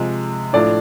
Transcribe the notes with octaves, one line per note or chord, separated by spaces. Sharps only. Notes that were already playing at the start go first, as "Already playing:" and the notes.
Already playing: C3 F3 G#3
A2 F3 A3 D4 D5